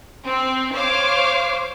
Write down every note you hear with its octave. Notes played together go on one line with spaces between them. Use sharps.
C4
C5 C#5 F5 D6